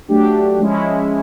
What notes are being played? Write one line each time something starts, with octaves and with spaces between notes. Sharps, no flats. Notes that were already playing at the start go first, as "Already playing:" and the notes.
F#3 A3 D4 G4
F3 G#3 C#4 E4